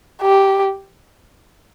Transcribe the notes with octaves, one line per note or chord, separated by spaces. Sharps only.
G4